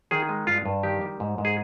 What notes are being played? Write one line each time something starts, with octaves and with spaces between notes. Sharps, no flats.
D#3 G#4
G#3
G2 F4
G2
D#3 G4
G3
G#2
G#2
G#4